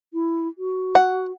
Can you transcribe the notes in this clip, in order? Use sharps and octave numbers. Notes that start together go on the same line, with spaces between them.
E4
F#4
F#5